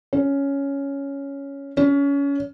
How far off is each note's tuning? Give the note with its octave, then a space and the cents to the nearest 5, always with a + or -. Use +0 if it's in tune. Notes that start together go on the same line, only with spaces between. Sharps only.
C#4 +5
C#4 +25